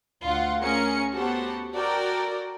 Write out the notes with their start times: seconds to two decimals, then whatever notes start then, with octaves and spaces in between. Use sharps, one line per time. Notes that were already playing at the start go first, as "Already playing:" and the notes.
0.23 D2 F4 F#5
0.61 A3 C#4 G#4 A#4 C#7
1.15 B3 F#4 G4 A4 C5 F#5
1.75 F#4 A4 A#4 D5 G5